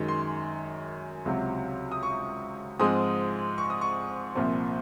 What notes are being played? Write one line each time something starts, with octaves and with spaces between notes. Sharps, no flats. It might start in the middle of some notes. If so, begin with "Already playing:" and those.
Already playing: F#2 D#3 G#3
C6
C#2 C3 F#3
D#6
C#6
G#2 F3 G#3 C4 D#6
C#6
D#6
C#6
C2 A#2 F3 C4